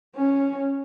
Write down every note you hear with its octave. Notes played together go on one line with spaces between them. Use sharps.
C#4